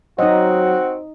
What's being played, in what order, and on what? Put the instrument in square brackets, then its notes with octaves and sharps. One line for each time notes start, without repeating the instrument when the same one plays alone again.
[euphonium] F#3 [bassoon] C4 [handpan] D#4 D#5 [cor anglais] F#4